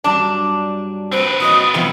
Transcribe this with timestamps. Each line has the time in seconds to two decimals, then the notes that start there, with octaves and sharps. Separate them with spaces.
0.04 G2 F#3 G3 D4
1.12 C4 B4 C5
1.40 F#4 C#5 D#5 D#6
1.74 B2 D#3 F3 G3 B5